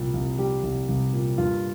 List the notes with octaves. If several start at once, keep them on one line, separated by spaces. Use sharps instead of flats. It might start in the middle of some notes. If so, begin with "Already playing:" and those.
Already playing: C2 A#2 G3
C2
G3 G4
C2
C2
A#2
G2 F4